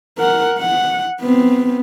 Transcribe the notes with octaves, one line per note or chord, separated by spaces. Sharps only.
A#4 F#5
F#5
B3 C4